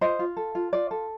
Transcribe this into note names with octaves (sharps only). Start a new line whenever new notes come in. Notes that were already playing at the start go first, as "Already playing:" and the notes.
F4 C5 D#5
F4
A4
F4
F4 D5
A4